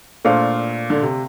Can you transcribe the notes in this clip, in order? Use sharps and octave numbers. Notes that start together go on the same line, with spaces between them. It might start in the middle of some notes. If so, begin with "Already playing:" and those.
A#2 A3 D4 A4 C5 F5
D3
C3